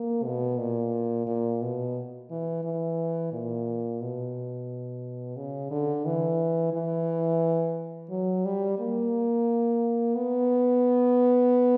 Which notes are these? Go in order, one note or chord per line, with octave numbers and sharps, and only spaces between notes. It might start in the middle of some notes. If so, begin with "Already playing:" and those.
Already playing: A#3
B2
A#2
A#2
B2
E3
E3
A#2
B2
C#3
D3
E3
E3
F#3
G3
A#3
B3